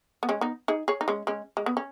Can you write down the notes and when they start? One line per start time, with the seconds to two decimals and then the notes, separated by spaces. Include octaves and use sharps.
0.23 B3
0.29 G#3 C#4
0.41 B3 D#4
0.68 D#4 G#4
0.88 G#4 C#5
1.01 D#4
1.08 G#3 C#4
1.27 G#3 C#4
1.57 G#3
1.66 B3
1.77 C#4